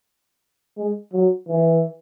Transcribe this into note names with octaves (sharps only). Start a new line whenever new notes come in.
G#3
F#3
E3